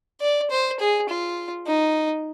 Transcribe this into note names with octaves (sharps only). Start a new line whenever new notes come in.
D5
C5
G#4
F4
D#4